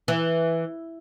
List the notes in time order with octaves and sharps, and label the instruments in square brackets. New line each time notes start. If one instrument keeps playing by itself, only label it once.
[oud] E3